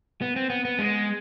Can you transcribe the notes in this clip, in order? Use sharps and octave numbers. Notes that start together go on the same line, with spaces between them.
B3
C4
B3
B3
G#3